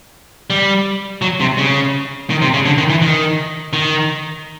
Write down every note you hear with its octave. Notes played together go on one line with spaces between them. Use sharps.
G3
F#3
C3
C#3
D#3
C3
C#3
D3
D#3
E3
D#3
D#3